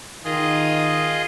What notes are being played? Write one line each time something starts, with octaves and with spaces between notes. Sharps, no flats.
D#3 F4 G#4 D#5